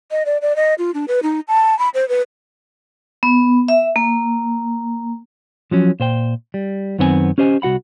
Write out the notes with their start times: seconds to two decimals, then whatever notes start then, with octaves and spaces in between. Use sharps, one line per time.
0.11 D#5
0.26 D5
0.42 D5
0.56 D#5
0.78 F4
0.94 D4
1.08 B4
1.23 D#4
1.48 A5
1.79 B5
1.94 C5
2.09 B4
3.23 B3
3.68 E5
3.96 A#3
5.71 F3 F#3 C#4
6.00 A#2 C5 G5
6.54 G3
6.99 F#2 D#3 B3 C4 C5 G#5
7.38 C#4 G4 C5 D#5 G#5
7.62 C2 F#4 F#5 B5